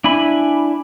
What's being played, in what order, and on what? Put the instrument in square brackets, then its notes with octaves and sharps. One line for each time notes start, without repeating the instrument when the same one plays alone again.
[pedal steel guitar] D4 E4 G#5 B5